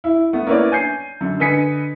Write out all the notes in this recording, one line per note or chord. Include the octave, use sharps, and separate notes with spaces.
E4
A3 B3
A#3 C#4 E4 B4 C#5 D5
G#5 G6 C7
F#2 D3
D3 B4 D#5 G#5 B6 C#7